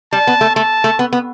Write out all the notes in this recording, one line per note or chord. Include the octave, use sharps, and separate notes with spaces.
G3 A5
B3
A3
A3 A5
A3
B3
B3